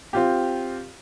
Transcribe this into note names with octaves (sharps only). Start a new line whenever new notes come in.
C4 F4 G4